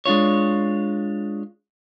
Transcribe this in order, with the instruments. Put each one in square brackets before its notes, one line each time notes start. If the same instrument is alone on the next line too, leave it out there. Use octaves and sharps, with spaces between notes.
[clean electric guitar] G#3 D4 F4 C#5